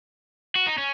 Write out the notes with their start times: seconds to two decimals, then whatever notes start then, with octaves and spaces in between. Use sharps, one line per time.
0.55 F#4
0.67 D#4
0.78 C#4